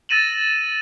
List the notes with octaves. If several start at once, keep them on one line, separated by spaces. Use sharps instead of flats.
E6 A6 A#6 D#7 E7 F#7